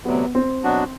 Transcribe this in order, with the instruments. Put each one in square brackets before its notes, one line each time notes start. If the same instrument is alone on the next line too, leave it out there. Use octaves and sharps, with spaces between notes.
[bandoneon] D2 C3 F#3 [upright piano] B3
[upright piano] C4
[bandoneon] B2 F#3 B3 D4 F#4